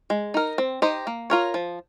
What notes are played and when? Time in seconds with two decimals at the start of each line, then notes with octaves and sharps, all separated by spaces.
0.10 G#3
0.34 D#4 A#4
0.58 C4
0.82 D#4 G4 C5 D#5
1.07 A#3
1.30 F4 A#4 C#5
1.54 F3